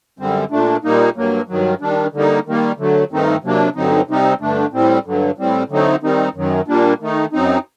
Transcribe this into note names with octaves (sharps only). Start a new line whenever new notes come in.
F#2 D3 G3 C4
A#2 A3 D4
A#2 G3 A#3 D#4
G2 F#3 A#3
G2 D#3 F#3
D#3 G3 D4
D3 G3 A#3 D#4
D#3 G3 A#3
D3 F#3 A3
G2 D#3 A3 C4 D#4
C3 F#3 A#3 D4
G2 D3 F#3 C4 D#4
C3 G3 C4 D#4
G2 D3 A3 D4
A2 G3 C4
G2 D3 F#3
A2 G3 C4
D3 F#3 A3 C4 D#4
D#3 G3 C4 D#4
F#2 D#3 F#3
A#2 G3 A#3 D4
D#3 A3 D#4
F#2 F#3 C4 D#4